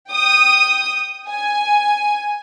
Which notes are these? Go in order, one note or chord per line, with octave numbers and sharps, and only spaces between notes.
G5 D#6
G#5